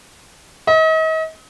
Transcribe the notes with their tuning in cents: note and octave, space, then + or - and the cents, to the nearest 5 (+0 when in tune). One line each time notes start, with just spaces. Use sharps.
D#5 +40